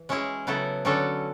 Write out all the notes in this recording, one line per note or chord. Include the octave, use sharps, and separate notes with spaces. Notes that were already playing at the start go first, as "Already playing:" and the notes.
Already playing: E3
G#3 C#4 E4 G#4
C#3 F#3 B3 E4 A4
D3 F#3 C#4 F#4 A4